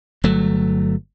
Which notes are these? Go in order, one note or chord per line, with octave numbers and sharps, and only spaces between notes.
G1 F#3 A3